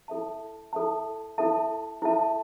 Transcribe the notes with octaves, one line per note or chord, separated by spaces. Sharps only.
E4 A4 E5 A5
E4 A4 E5 A5
E4 A4 E5 A5
E4 A4 E5 A5